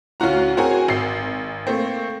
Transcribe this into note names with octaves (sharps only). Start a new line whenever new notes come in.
D2 C#4 F4 F#4 A#5
C4 F#4 G#4 A#4 C#5 G#5
G#1 C7
A3 A#3 C4